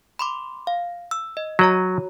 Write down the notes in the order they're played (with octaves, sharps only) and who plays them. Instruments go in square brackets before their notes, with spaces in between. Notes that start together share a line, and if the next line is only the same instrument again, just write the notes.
[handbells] B5 C6 D6
F5
E6
D#5
[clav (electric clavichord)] F#3 [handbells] F#4 C#5 A#5